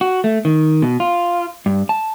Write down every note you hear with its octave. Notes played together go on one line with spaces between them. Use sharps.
F#4
A3
D#3
B2
F4
G2
A5